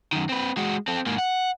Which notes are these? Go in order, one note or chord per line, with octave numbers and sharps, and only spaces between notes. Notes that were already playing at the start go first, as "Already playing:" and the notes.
F#2 D#3
C4 B4
G#3 F#4
C4 A4
G#2 A#3
F#5